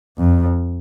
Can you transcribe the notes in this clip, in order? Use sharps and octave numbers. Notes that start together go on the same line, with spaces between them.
F2